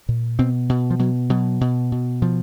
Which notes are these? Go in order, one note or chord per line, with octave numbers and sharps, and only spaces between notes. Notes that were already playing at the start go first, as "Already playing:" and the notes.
A#2
B2 C4
B2
F3
B2 F#3
B2 F#3
B2
B2
B2 F3